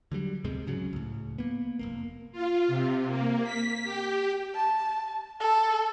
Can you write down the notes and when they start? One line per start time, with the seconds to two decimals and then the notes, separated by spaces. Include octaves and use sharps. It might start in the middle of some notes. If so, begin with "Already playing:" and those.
0.12 D3 F#3 G3
0.44 D2 G#2 C3 G#3
0.67 C#2 C#3 F#3
0.93 C#2 A2
1.38 A#3 B3
1.79 F1 E2 A#3
2.32 F4
2.68 C3
3.07 A#3
3.43 B6
3.83 G4
4.55 A5
5.40 A4